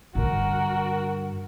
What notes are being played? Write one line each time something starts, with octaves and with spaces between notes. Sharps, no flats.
G2 D3 F#4 A#4